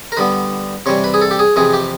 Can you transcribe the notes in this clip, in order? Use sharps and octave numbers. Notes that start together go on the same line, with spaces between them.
A#4
D3 G3 B3 B4
C3 E3 G3 C#5
B4
G#4
A4
G4
G#4
F2 C3 E3 G#4
G4